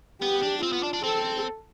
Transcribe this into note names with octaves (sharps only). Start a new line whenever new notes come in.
B3 G4
D4
C4 F4
B3
D4
D4
C4 A4